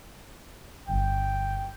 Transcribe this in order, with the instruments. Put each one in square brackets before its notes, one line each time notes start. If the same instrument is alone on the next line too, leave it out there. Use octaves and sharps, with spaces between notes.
[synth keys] G1 [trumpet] G5